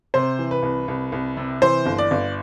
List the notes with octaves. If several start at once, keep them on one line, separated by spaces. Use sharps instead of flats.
C3 C5
E3
B4
C2
C2
C2
C3
E3 C5
G1
D5
G1